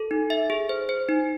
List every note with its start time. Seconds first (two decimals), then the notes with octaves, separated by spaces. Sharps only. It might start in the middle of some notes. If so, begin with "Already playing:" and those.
Already playing: A4
0.11 D#4
0.30 E5
0.50 G#4
0.69 C5
0.89 C5
1.09 D#4